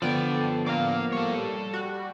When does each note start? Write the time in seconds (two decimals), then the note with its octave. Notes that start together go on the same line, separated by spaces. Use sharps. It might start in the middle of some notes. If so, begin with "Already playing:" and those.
0.02 D3 F3 B3 A4 D5 G5
0.66 A#3 D5 F5
1.12 G3 A4 C#5
1.73 F#4